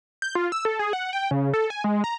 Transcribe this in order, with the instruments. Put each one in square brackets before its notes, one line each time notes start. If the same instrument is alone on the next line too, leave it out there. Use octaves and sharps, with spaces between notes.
[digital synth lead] G6
F4
E6
A4
G#4
F#5
G5
C#3
A4
G#5
G#3
A#5